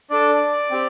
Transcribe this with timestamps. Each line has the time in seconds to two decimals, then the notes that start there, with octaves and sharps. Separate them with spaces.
0.10 D4 A4 D5
0.71 C4 G4